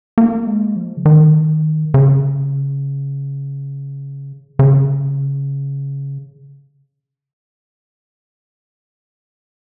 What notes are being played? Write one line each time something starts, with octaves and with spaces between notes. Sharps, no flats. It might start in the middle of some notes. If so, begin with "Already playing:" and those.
A#3
G#3
F3
C#3
D#3
C#3
C#3